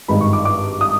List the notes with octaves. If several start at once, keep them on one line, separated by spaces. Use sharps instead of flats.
G#1 G2 D#3 G#3 B5
C#6
D6
D6
D#6